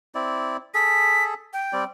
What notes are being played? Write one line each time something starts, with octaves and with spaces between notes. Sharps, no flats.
C4 E4 D5
G#4 A4 B6
G5
G3 C4 D5